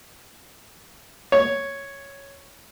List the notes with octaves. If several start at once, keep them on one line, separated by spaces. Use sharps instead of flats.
C#5